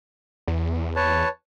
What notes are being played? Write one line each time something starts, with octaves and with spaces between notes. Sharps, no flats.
E2
B4 C#5 A5